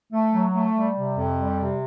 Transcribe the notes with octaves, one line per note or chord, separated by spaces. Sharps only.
A3
F#3
A3
G3
C3
F2
G3
C3